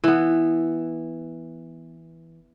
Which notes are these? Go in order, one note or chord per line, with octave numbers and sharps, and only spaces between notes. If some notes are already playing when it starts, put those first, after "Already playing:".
E3 B3